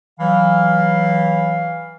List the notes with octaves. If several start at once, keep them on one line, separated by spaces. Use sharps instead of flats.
E3 F#3 F5